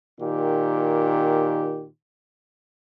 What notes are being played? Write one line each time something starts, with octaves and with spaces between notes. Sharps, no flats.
A#2 D#3 G4